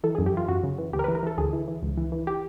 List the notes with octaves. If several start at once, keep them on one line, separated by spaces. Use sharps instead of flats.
E3 A4
G#4
F#2
G4
E3 F4
F#2 F#4
C#3
E3
D2 G4
A#4
B4
E3
A#4
E3 A4
D2 G#4
E3
E3
C#2
E3
E3
G4